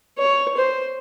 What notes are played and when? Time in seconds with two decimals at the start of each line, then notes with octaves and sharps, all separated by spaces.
0.18 C#5
0.57 C5